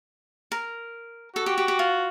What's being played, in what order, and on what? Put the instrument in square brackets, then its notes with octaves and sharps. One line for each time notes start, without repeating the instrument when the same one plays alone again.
[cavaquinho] A#4
[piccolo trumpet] F#4 [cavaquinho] A4
[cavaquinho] G4
G4
G4
F4